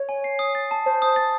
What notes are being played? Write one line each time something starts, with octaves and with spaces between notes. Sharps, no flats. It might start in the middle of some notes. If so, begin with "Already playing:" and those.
Already playing: C#5
G#5
C7
D#6
A6
A5
C5 A5
D#6
A6